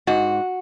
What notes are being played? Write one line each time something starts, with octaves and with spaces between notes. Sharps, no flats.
G#2 F#4